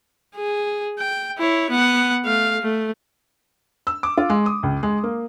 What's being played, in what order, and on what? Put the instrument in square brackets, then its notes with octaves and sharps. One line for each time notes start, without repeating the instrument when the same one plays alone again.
[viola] G#4
G5
E4 C#5
B3 F#5
A3 F5
A3
[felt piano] E6
D6
F4
G#3
D#6
C#2
G#3
A#3